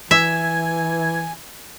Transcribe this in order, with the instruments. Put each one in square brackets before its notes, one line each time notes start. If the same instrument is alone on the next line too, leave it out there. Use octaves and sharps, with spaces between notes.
[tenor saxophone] E3 [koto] E5 [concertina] G#5 [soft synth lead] G#6